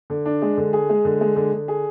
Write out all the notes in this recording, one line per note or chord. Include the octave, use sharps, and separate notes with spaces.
D3
D4
G#3
D3
G#4
G#3
D3
G#3
D3
D3
G#4